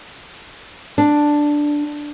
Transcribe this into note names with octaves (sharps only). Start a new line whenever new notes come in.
D4